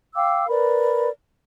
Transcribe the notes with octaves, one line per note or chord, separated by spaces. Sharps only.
F5 G5 D6 E6
A#4 B4 D5 B5